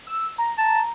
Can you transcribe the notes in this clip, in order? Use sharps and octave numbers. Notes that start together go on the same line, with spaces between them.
E6
A#5
A5